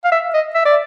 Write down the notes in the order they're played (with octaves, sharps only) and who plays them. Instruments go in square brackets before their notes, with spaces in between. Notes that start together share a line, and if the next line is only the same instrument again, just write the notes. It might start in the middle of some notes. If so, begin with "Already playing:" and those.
[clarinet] F5
E5
D#5
E5
D5